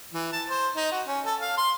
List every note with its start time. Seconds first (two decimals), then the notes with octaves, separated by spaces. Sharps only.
0.14 E3
0.33 A5
0.49 C5
0.76 D#4
0.92 F#4
1.07 C#4
1.26 A4
1.41 F5
1.57 C6